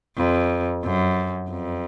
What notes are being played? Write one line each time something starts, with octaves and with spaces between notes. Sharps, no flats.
F2
F#2
F2